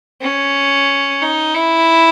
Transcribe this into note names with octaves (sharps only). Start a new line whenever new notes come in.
C#4
D#4
E4